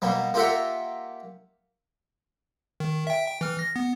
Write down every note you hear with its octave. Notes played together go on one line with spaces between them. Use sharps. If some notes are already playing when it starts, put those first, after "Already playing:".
B2 G3 A#3
A#3 F4 G4 A#4 E5 F#5
D#3
E5 G5
G5
E3 F6
A#6
B3